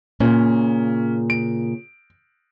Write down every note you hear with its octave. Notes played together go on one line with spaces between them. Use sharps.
A#2 C#3 C#4
D7